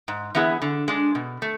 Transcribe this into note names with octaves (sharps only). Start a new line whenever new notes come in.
G#2
E3 B3 E4 G#4
D3
G#3 D4
B2
A3